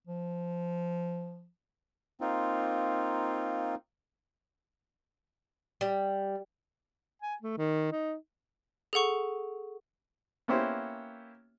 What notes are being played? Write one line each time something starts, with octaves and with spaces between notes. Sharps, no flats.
F3
A#3 C4 D#4 F4
G3
G#5
A3
D#3
D#4
G#4 A4 F#5 C#6
A#3 B3 C#4 E4 G4 C5